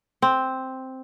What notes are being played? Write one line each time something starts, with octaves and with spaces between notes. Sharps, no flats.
C4